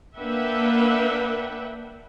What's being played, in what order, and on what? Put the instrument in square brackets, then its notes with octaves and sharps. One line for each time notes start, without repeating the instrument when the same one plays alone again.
[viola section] A#3 D4 B4 E5 F#5 G5